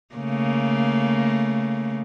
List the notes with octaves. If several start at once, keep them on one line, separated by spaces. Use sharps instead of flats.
C#3 A3 A#3